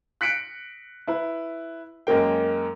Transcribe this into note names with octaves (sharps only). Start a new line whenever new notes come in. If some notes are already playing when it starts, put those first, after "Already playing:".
F#6 B6 C#7 D7
E4 B4
F#2 G#3 A#3 G5